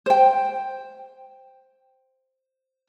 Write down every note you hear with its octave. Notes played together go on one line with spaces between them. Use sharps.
C5 G5